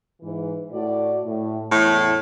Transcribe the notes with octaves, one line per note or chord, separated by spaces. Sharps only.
G#2 E3
A2 F#4 D5
A2
E2 A2 E4